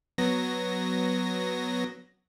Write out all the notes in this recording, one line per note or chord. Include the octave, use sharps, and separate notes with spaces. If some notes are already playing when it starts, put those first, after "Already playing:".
F#3 B3 A#6